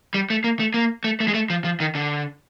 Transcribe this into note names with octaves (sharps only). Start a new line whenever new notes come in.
G3
A3
A#3
A3
A#3
A3
A3
G#3
A3
F3
F3
D#3
D3